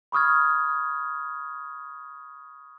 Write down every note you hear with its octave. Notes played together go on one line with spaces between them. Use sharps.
B5 C#6 D#6 F6 G#6